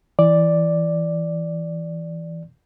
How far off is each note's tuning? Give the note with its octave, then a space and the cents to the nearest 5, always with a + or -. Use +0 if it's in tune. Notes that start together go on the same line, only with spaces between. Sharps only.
E3 +0 D5 +0